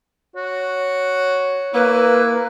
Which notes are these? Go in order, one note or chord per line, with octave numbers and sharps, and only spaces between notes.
F#4 C#5
A#3 E4 B4